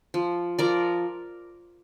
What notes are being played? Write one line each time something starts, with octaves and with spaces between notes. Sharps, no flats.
F3
F3 A#4 D5